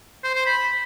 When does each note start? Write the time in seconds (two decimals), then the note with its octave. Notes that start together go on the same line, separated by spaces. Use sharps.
0.24 C5
0.35 C5
0.46 B5